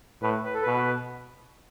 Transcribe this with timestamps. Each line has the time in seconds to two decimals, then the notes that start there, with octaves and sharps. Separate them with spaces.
0.22 A2 B4
0.44 B4
0.54 A4
0.62 B2 B4